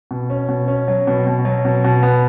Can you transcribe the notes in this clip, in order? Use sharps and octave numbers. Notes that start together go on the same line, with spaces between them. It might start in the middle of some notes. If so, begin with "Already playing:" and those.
B2
C#4
B2
C#4
F#3
B2
B2
F#3
B2
B2
B3